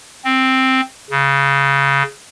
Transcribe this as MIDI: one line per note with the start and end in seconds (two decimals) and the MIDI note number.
0.25 0.81 60
1.10 2.03 49